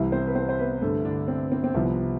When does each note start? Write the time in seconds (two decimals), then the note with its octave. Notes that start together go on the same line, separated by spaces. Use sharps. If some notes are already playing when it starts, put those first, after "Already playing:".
Already playing: C2 C3 E3 G3 E4
0.12 C4 C5
0.27 B4
0.35 C4 C5
0.49 C5
0.59 B3 B4
0.81 G2 D3 A3 A4
1.05 D3 D4
1.28 C4
1.52 C4
1.64 C4
1.74 C2 C3 F3 B3